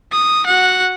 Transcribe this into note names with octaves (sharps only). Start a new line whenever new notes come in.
D#6
F#4 F#5